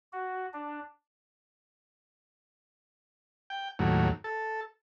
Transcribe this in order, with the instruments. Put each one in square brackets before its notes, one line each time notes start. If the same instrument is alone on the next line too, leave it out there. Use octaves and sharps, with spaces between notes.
[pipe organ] F#4
D4
[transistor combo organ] G5
D#2 A2 F#3
A4